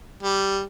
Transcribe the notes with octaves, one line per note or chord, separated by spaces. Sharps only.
G3